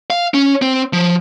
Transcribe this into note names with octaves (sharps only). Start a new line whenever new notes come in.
F5
C#4
C4
F3